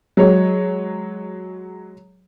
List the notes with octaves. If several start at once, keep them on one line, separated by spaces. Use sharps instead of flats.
F#3 G#3 C#5